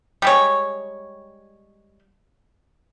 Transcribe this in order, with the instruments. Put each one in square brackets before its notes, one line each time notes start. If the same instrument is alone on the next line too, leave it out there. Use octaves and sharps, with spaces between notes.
[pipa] G3 G#3 C#5